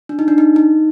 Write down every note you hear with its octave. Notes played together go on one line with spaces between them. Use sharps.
D4
D#4
D4
D#4
D#4